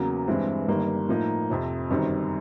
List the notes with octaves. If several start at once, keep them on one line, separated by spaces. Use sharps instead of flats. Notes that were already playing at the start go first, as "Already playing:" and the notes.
Already playing: E2 C#3 F#3 A#3
G2 E3 G#3 C4
G1 G2 D#3 G3 A#3
A2 F3 A#3 D#4
F2 C3 F3
G1 F#2 D#3 G3 C4